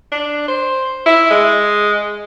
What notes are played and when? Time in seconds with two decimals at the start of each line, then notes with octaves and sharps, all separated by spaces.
0.12 D4
0.48 C5
1.06 E4
1.31 G#3